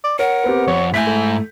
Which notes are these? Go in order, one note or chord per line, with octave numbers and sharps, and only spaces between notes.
D5
A#4 C#5 F#5
B3 C4 G4
F2 C4 C#5
G#2 A3 E4 G#5 G6 B6
A4